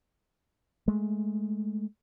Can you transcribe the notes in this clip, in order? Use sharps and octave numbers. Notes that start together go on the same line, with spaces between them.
G#3 A3